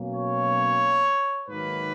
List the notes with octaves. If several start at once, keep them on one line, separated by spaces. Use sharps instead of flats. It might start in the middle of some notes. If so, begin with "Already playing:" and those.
Already playing: B2 F#3 A#3 C#4
C#5
G#2 D#3 F#3 A#3 B4